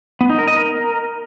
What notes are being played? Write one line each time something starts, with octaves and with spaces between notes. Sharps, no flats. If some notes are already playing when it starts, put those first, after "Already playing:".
B3
D#4
A#4
D#5
A#4